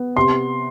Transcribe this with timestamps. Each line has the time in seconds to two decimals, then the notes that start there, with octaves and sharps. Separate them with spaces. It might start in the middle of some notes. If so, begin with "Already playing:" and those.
Already playing: B3
0.16 C3 C6